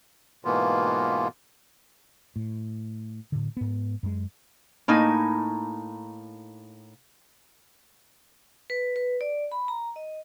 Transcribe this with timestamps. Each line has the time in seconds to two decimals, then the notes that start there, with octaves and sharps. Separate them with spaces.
0.45 G#2 B2 E3 A#3 B3 F4
2.36 A2
3.32 A2 D3
3.57 G#2 B3
4.03 F#2 G#3
4.88 A2 A#3 D#4 G#5
8.70 B4
8.96 B4
9.21 D5
9.52 B5
9.68 A#5
9.96 D#5